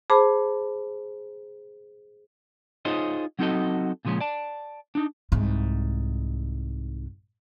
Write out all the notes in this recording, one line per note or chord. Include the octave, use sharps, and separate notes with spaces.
G#4 C5 A5 B5 D6
D#4 F4 G#4 C5 C#5 D#5
F#3 C4 D#4 F#4 A4 D#5
A#2 C#3 F3 G#3 C#4
D5 A5
D4 D#4
C2 G#2